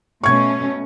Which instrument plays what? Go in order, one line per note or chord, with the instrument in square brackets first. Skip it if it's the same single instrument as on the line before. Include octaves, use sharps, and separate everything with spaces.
[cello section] B2 A3 C#4 [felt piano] C#6 G#6